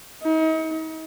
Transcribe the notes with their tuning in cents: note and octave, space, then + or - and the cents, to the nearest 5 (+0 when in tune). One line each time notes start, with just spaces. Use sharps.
D#4 +40